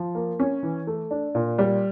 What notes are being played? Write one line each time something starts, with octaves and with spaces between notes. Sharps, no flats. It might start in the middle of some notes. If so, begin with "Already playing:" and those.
Already playing: F3
A#3
C#4
E3
A3
D4
A#2
G3